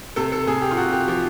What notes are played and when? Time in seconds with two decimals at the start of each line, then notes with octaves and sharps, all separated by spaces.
0.16 C3 A4
0.32 A4
0.47 C3 G#4
0.62 G4
0.71 F4
0.77 C3 F#4
0.93 G4
1.08 F3 G4